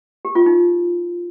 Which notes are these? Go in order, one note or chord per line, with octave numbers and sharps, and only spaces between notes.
G4
F4
D#4